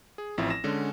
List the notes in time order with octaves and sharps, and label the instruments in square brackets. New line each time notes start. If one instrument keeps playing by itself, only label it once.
[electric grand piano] G#4
A1 F3 C4 E4
A#6 E7
D3 G#3 C#4